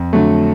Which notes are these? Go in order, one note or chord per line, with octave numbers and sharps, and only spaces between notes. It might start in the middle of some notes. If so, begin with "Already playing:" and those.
Already playing: F2
D3 F#3 A3